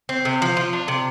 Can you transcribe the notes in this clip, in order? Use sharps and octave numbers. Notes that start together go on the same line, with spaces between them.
C4
C3
F3
F4
D4
C3